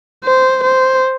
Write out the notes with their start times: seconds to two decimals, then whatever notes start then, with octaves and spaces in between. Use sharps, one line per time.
0.24 C5
0.63 C5